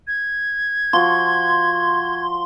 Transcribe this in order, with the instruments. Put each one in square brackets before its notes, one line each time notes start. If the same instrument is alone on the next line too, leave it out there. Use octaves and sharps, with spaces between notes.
[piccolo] G#6
[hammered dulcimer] F3 F#4 [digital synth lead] C6